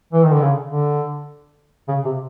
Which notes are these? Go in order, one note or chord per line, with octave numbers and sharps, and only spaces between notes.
E3
D#3
D3
C#3
D3
C#3
C3